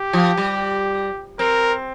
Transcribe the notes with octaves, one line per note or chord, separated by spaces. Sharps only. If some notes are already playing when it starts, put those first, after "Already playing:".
Already playing: G4
F3
G3
C4 A#4